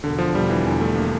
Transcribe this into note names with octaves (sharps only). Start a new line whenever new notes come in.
E1 D3
F3
E1 G3
E3
E2 D3
A3
A#3